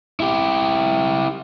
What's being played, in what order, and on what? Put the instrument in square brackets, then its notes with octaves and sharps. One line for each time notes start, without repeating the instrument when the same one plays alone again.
[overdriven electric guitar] E4 G4